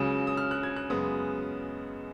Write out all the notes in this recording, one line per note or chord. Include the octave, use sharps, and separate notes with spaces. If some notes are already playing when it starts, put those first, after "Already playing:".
Already playing: C#2 C#3 F#3 D#6
D#6
F6
F#6
G#6
F#6
F#2 C#3 G#3 B3 D#6